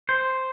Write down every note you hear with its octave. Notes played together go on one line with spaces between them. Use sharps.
C5